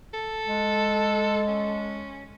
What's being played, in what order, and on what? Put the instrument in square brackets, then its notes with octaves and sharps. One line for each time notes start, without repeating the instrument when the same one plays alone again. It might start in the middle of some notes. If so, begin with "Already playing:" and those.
[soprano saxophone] A4
[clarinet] G#3
[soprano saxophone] C#4